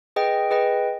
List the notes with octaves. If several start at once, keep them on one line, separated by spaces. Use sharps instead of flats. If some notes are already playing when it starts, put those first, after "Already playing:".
G#4 B4 D#5 G5
G#4 B4 D#5 G5